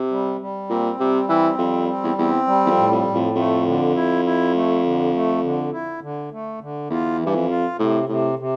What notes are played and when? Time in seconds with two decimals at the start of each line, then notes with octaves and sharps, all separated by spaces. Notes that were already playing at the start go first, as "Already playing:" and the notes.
Already playing: C3
0.11 G3
0.41 G3
0.70 A#2 C4
1.00 C3 G3
1.29 E3 C4
1.58 F2 G3
1.89 C4
2.04 E2
2.18 E2 C4
2.47 G3
2.66 E2
2.70 F2
2.77 A2
2.92 F2
3.07 A2
3.14 F2
3.36 F2 A3
3.66 D3
3.95 E4
4.25 E4
4.54 A3
4.84 D3
5.13 A3
5.43 D3
5.73 E4
6.02 D3
6.32 A3
6.61 D3
6.90 E2 F4
7.20 E3
7.26 G2
7.35 F2
7.50 F4
7.79 A2 C3
8.09 A2 C3
8.39 C3